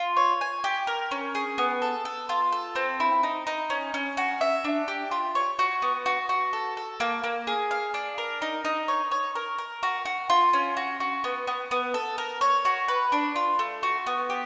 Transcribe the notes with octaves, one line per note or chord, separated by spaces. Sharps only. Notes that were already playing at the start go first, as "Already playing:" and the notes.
Already playing: F4
C#5
G#5
G4
A#4
C#4
G#4
B3
A4
A4
F4
A4
C4
E4
D#4
D#4
C#4
C#4
F#4
E5
D4
G4
F4
C#5
F#4
B3
F#4
F#4
A4
A4
A#3
A#3
G#4
F5
D4
A#4
D#4
D#4
C#5
C#5
A#4
A#4
F#4
F#4
F4
C#4
F#4
F#4
B3
B3
B3
A4
A#4
C#5
F#4
B4
D4
F4
A3
F#4
B3
G4